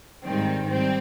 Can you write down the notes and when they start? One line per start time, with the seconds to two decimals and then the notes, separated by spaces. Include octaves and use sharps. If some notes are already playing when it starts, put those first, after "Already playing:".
0.24 G#2 D#3 G3 C4
0.69 G3 C4